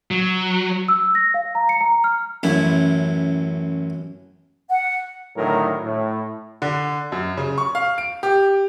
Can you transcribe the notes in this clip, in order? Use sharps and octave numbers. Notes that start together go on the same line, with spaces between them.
F#3
E6
A#6
F5
A#5
C#7
A#5
F6
A1 F#2 E4
F#5
A2 D3 D#3 F#3 A#4
A2
D3
F#2
C#3
C#6
F5
D7
G4